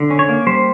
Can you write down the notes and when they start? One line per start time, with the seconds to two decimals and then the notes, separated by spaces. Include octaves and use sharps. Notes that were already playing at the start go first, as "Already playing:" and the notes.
Already playing: D3
0.10 C#4
0.19 C#5
0.29 A#3
0.47 G3 C5